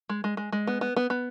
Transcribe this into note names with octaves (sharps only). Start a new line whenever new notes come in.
G#3
G#3
G#3
G#3
B3
B3
B3
B3